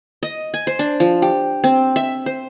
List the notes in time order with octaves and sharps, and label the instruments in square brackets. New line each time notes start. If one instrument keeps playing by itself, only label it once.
[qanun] D#5
G#5
C5
D4
F3
G4
C4
E5
C5